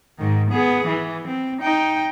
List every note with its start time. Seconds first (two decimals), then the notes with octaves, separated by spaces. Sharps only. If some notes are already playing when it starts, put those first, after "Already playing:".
0.18 G#2 D#3
0.50 B3 G#4
0.87 E3
1.28 C4
1.61 D#4 G5